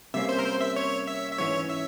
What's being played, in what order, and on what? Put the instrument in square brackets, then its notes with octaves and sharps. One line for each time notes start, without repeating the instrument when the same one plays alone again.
[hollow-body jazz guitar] C3 G3 A#3 C#4 [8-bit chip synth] E5
[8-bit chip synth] C5
A#4
C5
E5
C#5
E5
E5
[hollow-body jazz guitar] G#2 E3 G#3 C#4 [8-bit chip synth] C#5
[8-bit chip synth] E5